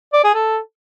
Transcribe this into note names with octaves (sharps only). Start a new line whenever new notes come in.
D5
G#4
A4